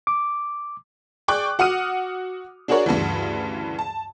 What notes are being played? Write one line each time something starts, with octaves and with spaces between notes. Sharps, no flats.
D6
G#4 D5 G5 C#6 D6 F#6
F#4 F#5 D#6 F6 D#7
D4 F#4 G#4 A#4 C#5 D5
D2 G2 C#3 E3
A5